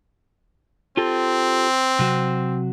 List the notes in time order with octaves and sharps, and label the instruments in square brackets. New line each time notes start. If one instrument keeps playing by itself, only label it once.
[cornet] C4 [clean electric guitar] F4 G4 A4
[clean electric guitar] C3 F#3 F#4